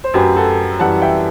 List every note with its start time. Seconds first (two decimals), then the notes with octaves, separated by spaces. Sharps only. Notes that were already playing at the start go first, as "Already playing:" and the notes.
0.04 C5
0.14 F#2 F#3 G4 B4
0.36 F#4 A4
0.80 F#2 E3 G3 F#5 A5
1.02 E5 G5